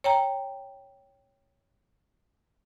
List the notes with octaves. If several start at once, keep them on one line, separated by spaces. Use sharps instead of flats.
C#5 G5 A#5